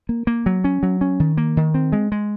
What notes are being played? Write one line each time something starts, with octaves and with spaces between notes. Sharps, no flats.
A#3
A#3
F#3
C#4
F#3
C#4
D#3
A#3
D#3
C4
G#3
G#3